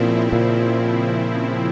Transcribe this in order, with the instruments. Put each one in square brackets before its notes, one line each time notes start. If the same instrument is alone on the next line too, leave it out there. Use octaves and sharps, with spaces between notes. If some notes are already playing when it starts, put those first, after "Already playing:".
Already playing: [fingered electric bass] A#2 [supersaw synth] C#3 F3 C4 E4
[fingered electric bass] A#2